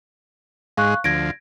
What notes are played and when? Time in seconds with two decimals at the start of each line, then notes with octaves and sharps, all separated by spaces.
0.77 G#2 G#3 F5 C#6 F#6
1.04 D2 F3 G#6 A#6 D7